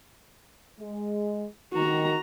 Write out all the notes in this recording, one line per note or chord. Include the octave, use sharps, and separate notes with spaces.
G#3
D#3 F#4 A#5